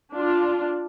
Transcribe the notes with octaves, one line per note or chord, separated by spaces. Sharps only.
D4 F4